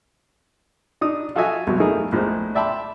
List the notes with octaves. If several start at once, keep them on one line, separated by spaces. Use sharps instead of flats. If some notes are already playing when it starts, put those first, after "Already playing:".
D4 D#4 D#6
F4 F#4 A4 D#5 E5 G#5
C2 B2 F#3
A3 A#3 D#4 E4 G#4 A#4
A#1 A2 G#3 C5
D5 E5 G5 A5 B5 C6